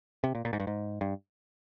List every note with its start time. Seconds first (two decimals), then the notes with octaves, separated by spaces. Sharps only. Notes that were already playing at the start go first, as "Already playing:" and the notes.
0.24 C3
0.35 A#2
0.45 A#2
0.53 G#2
0.60 G2
0.67 G#2
1.01 G2